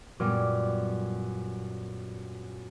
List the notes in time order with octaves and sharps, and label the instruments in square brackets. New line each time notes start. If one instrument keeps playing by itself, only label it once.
[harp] F#2 A#2 G3 B3 D6 F6